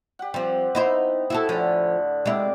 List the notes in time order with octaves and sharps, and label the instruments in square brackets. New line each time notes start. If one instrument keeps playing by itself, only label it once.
[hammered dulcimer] G4 F#5
[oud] F3 G3 [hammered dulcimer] C4
[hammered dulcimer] B3 [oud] D#4 E4 C5
[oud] E4 F#4 A4
[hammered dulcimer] A2 D3 [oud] F3 C#4
[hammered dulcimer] C3 D5 D6 [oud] G#3 E4